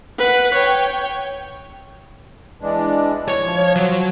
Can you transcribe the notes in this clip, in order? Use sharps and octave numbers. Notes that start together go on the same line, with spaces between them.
B4 F#5
C#5 G5
E3 G#3 D4
C#5
F3
F#3